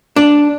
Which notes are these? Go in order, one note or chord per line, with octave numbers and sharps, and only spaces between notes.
D4